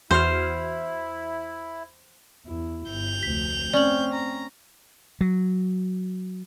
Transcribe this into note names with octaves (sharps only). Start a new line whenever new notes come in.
E2 E4 F#4 C5 F6
E2 E4
G1 G6 F7
F1 D2 B6
A3 C4 C#4 D5 F#7
A#5
F#3